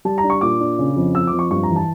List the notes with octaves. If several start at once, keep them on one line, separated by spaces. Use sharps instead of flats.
G3 A5
A#5
D4
C#6
A#2 D6
D4
C#3
F2
F2 E6
D6
F2
C#6
G2 C#6
A#5
E3
A5